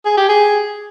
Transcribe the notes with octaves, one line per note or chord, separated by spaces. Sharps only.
G#4
G4
G#4